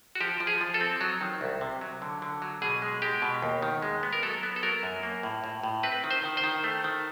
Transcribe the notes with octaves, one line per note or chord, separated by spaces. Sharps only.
F#4
F3 G4
F3
G#4
F3
A4
C4
F#3
D#3
C2
C3
F#3
D3
D3
F#3
B2 G#4
G#3
G#3 G4
B2
D#2
D#3
G#3
B3
A#4
F#3 A4
B3
A4
F#3 A#4
F#2
A#3
A2
A2
A2
C4 B4
D#3
C5
D#3
C5
D#3
A3
D#3